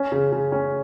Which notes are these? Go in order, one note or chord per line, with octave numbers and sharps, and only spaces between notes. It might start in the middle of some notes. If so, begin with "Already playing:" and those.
Already playing: C#4
C#3
C#3
C#4